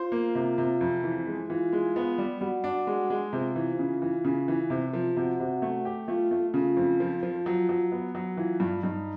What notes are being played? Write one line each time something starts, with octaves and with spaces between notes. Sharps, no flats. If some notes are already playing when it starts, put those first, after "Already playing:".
Already playing: F4 C5
A#3
C3
C3
F2
E3
G#3
E3 F4
G#3
B3
G3
G3 F#4
D4
G#3
G#3
C3 F4
E3
C#3
E3
C#3
E3
C3
F3
C3 F#4
C3
A3
G4
A3 F4
A3
C#3 F4
F2
F3
F3
F#3
F#3
B3
F#3
E3 F4
G2
G2 D#4